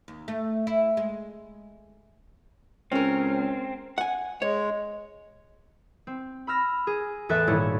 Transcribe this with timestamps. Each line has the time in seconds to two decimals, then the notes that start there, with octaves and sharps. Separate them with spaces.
0.08 D#2
0.28 A3
0.67 E4
0.97 G#3
2.92 C#2 C4 C#4 A#4
3.98 F#5 G#5
4.42 G#3 C#5
6.07 C4
6.47 B5 E6 F6 A#6
6.87 G#4
7.29 A1 E2 A4 E5 F#6 A6
7.47 D#1 G#2 A3 E4 C#5